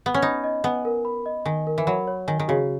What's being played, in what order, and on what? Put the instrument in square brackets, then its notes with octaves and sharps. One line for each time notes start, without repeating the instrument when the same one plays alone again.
[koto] B3
C#4
[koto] D#4 [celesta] B5
[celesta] D#5
[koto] B3 [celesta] G#5
[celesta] A#4
B5
D#5
[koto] D#3 [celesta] G#5
[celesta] A#4
[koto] E3
[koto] F#3 [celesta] B5
[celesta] C#5
[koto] D#3 [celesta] G#5
[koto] D#3
[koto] C#3 [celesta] F#4